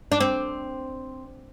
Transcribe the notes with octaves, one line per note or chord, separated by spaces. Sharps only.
D4
C4